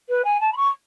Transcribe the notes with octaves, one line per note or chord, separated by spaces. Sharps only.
B4
G#5
A5
B5
C#6